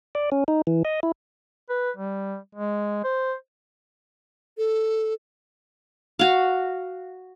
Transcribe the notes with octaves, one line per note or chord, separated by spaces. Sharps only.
D5
C#4
D#4
E3
D#5
E4
B4
G3
G#3
C5
A4
F#4 F5